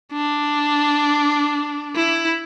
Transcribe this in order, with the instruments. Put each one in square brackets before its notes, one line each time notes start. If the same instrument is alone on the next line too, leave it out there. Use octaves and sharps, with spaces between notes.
[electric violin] D4
E4